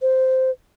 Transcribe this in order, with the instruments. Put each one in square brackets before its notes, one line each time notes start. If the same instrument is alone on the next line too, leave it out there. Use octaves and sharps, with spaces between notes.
[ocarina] C5